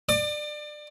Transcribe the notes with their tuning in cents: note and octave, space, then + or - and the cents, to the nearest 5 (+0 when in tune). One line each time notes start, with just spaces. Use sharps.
D5 +25 D6 +40